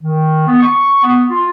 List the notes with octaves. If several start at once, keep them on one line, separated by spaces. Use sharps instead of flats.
D#3
B3
C#6
B3
F4